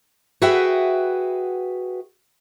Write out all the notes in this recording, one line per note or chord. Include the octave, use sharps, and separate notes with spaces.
F#4 G#4 B4 E5 F#5 G5